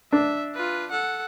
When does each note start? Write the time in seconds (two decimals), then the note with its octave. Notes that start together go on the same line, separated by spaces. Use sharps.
0.12 D4 E5
0.54 F4 B4
0.91 A4 F#5